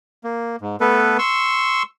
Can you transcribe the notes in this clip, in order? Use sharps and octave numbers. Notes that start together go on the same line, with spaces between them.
A#3
G#2
A3 B3 A4 B4
C6 C#6 E6